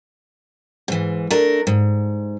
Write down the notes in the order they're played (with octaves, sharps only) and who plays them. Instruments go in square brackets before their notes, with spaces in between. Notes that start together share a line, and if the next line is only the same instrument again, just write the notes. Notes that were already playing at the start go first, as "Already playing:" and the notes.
[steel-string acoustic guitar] G#2 E3
A3 D4 A#4
G#2